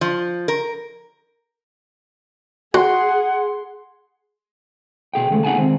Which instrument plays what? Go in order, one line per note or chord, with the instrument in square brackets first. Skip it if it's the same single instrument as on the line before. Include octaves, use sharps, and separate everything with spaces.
[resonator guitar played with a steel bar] F3
A#4
[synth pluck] F#4 [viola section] G#4 [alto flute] F#5 [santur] C6
[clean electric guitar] B2 G#4 G5
D#2 C#3 G#3 A3
B3 D#4 G#4 F#5 G#5 A5
C2 D#3 G#3 C4